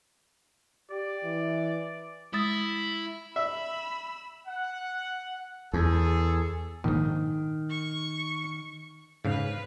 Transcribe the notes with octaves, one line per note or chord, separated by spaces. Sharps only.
G4 D5
E3
G#3 E4 D#6 A6
E5 B5 E6
F#5
E2 G#4 A4
A#1 G#2 D#3
C#6
G#2 C#3 B4 F5